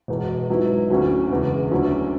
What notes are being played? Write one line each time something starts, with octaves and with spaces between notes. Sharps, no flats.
E1 E2 B2
G#2 F#3 B3 E4
D2 D3 F#3 C#4 F#4
E1 E2 C#3
D2 D3 F#3 C#4 E4